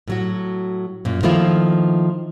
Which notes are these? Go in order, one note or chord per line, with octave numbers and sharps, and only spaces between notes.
A2 F#3 F#4
F#2 A#2
D#3 F3 A3 A#3 E4 F4